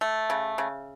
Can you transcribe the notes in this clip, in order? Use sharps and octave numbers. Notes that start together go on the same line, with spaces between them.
A3
C#3
C#3